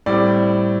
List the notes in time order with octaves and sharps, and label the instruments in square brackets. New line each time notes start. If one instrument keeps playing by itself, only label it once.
[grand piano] A2 G3 C4 D5